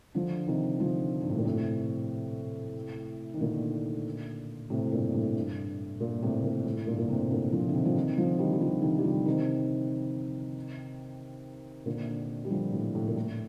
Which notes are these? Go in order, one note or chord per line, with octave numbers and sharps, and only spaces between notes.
D3 F3
C3 D#3
D3 F3
G2
A2
A#2
A2 C3
D#3
A#2 D3
A2 C3
A2
G2 A#2
A2
G2
G2 A#2
A2 C3
A#2 D3
A2
G2 A#2
A#2
A2 C3
A#2 D3
D3 F3
D3
C3 D#3
F3
C3 D#3
D3 F3
D#3 G3
G3
D3 F3
C3 D#3
G3
D3 F3
C3 D#3
A#2 D3
G3
D3 F3
A2
A2
A#2
A2